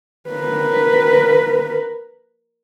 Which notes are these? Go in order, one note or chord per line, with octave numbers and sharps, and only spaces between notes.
A#4 B4